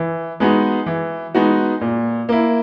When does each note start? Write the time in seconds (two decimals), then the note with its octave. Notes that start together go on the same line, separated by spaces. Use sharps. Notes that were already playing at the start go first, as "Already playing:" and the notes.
Already playing: E3
0.40 G#3 B3 D#4 F#4
0.86 E3
1.34 G#3 B3 D#4 F#4
1.81 A#2
2.29 A#3 E4